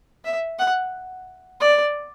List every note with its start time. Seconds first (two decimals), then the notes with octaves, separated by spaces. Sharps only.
0.25 E5
0.59 F#5
1.61 D5